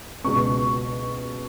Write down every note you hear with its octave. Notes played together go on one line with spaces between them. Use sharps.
C#2 B2 C#6